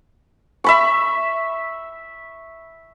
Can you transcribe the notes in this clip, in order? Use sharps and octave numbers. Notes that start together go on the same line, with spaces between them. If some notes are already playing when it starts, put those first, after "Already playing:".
E5 B5 C#6